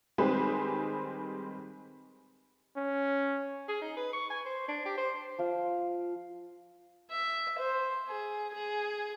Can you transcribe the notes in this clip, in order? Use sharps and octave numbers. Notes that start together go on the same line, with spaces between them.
D#3 G3 G#3 C4 G#4 B4
C#4
G#4
D#4
B4
C#6
G#5
C5
D4
G4
C5
F3 F5
E5
C5
G#4
G#4